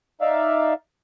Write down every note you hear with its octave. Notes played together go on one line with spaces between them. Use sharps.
D#4 D5 E5 F5